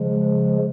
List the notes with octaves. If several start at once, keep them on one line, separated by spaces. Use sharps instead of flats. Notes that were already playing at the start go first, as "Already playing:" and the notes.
Already playing: C#3 F3 G#3